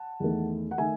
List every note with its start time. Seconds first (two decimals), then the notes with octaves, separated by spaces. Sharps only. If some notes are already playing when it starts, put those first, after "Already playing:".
Already playing: F#5 A5
0.20 E2 D#3 A3
0.71 F#5
0.78 D#3 A3 E5 G#5